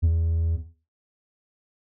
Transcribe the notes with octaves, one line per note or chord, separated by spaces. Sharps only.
E2